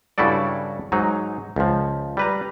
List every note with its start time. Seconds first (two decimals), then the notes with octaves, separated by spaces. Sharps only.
0.18 G2 C#3 E4 F#4 A4 D5
0.92 G#2 F#3 D#4
1.56 C#2 F3
2.17 G3 B4 A#5